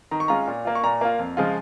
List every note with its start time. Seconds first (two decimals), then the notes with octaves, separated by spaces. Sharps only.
0.11 D#3 A#5
0.20 C#6
0.28 G#3 C#4 F4 A#5
0.47 A#2
0.65 A#3 F4
0.75 C#6
0.84 A#2 A#5
1.01 A#3 F4
1.19 F2
1.37 C#3 F3 G#3 F4